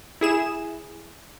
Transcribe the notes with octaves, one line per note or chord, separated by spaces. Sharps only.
E4 G#4 E7